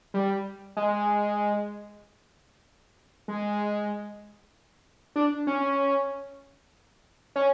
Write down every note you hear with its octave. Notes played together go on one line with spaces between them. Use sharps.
G3
G#3
G#3
D4
C#4
C#4